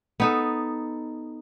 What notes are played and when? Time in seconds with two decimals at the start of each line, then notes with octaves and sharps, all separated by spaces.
0.20 B3 D#4 A4